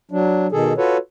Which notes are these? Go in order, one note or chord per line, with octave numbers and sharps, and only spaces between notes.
F#3 D4
B2 D#3 G#4 A4
F4 F#4 A4 B4 C#5